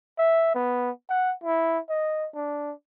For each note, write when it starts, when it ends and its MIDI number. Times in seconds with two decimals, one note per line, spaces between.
0.18 0.53 76
0.55 0.90 59
1.10 1.33 78
1.44 1.79 64
1.89 2.28 75
2.35 2.73 62